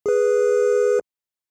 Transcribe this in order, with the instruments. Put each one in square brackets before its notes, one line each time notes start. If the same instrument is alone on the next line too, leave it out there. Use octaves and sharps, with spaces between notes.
[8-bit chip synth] G#4 B4